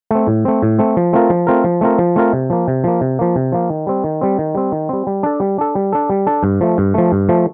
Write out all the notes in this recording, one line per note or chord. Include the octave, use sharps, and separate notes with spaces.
A3 C4
A2
A3 C4
A2
A3 C4
F3
A3 C4 F4 A#4
F3
A3 C4 F4 A#4
F3
A3 C4 F4 A#4
F3
A3 C4 F4 A#4
C3
F3 A#3
C3
F3 A#3
C3
F3 A#3
C3
F3 A#3
D#3
G3 C4
D#3
G3 C4
D#3
G3 C4
D#3
G3 C4
G3
D4 A4
G3
D4 A4
G3
D4 A4
G3
D4 A4
G2
F3 A3
G2
F3 A3
G2
F3 A3